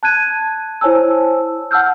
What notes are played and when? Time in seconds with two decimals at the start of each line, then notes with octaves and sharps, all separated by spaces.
0.03 A5 F#6 G#6 D#7
0.81 E4 C5 C#5 G#5 A5 E6
1.71 F#5 A5 E6 F6 G6